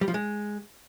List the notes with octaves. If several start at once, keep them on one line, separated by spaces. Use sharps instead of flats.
G3
F3
G#3